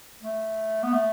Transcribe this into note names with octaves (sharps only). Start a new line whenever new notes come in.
A3
B3
A3